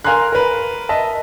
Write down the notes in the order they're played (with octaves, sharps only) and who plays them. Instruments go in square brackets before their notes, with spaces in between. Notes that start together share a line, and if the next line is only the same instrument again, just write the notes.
[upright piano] A#4 F5 G#5 A#5 C6 F#6
A#4 B4
D#5 E5 A5